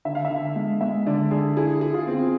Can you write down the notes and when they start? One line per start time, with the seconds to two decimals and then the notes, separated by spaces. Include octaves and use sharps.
0.05 D3 E5
0.15 F5
0.25 E5
0.30 D3
0.56 G#3
0.81 G#3 E5
1.06 D3 D5
1.31 D3 G#4
1.57 E4 G#4
1.81 G#4
1.94 F4
2.07 C4